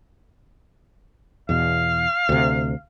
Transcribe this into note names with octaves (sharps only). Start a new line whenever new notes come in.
E2 B2 F5
D2 C3